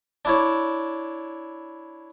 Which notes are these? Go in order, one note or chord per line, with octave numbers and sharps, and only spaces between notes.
D4 E4 C#5